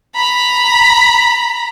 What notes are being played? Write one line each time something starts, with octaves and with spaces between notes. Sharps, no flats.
A#5 B5